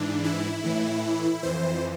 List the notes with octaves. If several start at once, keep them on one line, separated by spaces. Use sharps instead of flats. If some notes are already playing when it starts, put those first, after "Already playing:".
Already playing: G#2 E3 D4
E4
A2 E3
F2 E3 C5